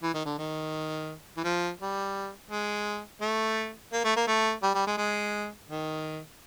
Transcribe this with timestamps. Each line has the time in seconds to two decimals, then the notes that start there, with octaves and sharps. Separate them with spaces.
0.03 E3
0.14 D#3
0.25 D3
0.38 D#3
1.37 E3
1.44 F3
1.80 G3
2.50 G#3
3.21 A3
3.93 A#3
4.04 A3
4.16 A#3
4.27 A3
4.63 G3
4.74 G3
4.87 G#3
4.98 G#3
5.69 D#3